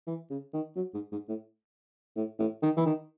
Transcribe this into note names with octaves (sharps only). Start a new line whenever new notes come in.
E3
C#3
D#3
F#3
G#2
G#2
A2
A2
A2
D#3
E3
D#3